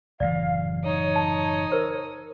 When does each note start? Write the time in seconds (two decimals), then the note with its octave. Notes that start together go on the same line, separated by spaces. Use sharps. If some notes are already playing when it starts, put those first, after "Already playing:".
0.20 F#1 A2 E3 D5 F5
0.84 D#4 C#5 D#6
1.16 A5
1.72 A#4 C5